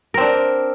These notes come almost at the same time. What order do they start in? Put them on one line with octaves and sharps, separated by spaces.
A#4 C4 D4